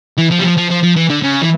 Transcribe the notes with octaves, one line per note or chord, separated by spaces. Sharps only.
E3
F3
G3
F3
F3
F3
F3
E3
D3
C#3
E3